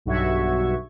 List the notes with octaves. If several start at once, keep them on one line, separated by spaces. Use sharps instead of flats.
B1 G2 F#4 E5 C#6 G#6